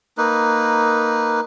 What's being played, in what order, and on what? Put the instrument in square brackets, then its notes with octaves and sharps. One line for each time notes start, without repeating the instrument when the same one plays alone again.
[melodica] A#3 D#4 B4